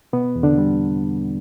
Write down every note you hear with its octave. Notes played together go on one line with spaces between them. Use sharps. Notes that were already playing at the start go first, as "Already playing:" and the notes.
B2 B3
E2
D3 D4
G3